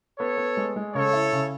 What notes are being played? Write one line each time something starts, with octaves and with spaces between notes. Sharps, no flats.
B3 A4 C#5
B3
G#3
G#3
C#3 A4 C#5
E4
C#3